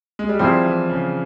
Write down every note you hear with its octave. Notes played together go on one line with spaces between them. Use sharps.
G#3
G3
F3 G3 C4 E4 G#4 C5
E3
C#3